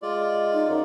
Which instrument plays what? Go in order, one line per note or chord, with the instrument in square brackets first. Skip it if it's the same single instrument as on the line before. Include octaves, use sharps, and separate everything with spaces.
[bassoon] G#3 [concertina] F4 D5
[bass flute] D#4
[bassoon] F#2